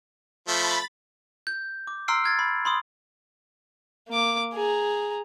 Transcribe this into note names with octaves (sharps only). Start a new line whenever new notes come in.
F3 A3 B5 A6
G6
D6
A#5 C6 E6 F6 C7 D7
F6 G#6 A6
B5
B5 C6 D#6
A#3 D6
G#4 A#5